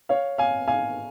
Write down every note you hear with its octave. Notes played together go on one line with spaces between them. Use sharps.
C#5 F5
F5 G#5
F5 G#5